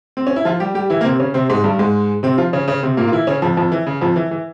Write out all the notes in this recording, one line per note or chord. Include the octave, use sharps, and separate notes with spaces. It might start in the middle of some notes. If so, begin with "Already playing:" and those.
C4
C#4
E4
F3 F4
G3 G4
G3 G4
E3 E4
A#3
C3 C4
C#3 C#4
C3 C4
G#2 G#3
G2 G3
G#2 G#3
C3 C4
F3 F4
C#3 C#4
C#3 C#4
C3 C4
A#2 A#3
F4
E3 E4
C#3 C#4
F2 F3
F2 F3
E3
C#3
F2 F3
E3
E3